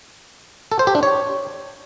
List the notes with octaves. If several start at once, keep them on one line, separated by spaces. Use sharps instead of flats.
A4
C5
G4
D4
C#5